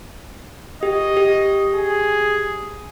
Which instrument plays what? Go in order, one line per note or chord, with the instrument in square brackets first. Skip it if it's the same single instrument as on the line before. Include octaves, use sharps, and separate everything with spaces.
[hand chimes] G4 [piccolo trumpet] D#5
[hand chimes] G4
[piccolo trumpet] G#4